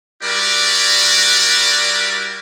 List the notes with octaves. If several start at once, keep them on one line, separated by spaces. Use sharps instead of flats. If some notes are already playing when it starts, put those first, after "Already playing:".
G3 E4 F#4 A#4 D5